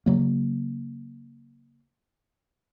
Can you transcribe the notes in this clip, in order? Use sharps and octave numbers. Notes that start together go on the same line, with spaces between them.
C#3 F#3 A#3